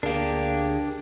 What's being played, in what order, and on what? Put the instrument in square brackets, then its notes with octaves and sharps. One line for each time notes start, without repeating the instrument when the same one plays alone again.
[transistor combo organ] D2 G#4 [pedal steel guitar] D4 G4 [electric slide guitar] A#4 F5